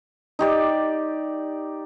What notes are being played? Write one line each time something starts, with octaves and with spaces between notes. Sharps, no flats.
D#4 G4 D5